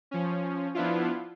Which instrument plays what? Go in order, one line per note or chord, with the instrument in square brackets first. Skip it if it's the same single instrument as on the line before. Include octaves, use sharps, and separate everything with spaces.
[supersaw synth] F3 C#4
F3 B3 D4 E4 F4